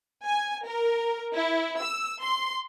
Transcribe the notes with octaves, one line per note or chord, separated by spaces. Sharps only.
G#5
A#4
E4
E6
C6